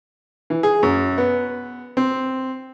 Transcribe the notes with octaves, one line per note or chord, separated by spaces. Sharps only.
E3
G#4
F#2
B3
C4